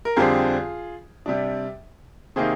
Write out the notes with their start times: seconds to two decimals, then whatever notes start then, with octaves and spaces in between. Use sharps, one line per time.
0.05 A#4
0.16 F2 D3 G3 C4 F4 G#4
1.26 C3 G3 D4
2.36 C3 D#3 A#3 D#4 G#4 C5